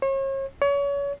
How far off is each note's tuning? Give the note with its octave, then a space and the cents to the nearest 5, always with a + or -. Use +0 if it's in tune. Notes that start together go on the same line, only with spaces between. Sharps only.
C#5 -40
C#5 +30